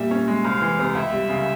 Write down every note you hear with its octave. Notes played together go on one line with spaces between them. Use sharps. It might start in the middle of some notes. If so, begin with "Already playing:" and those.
Already playing: A#2 G3 E5
C#4
G#3
C2 F5
E3
C3
C#2 E5
G3
C#3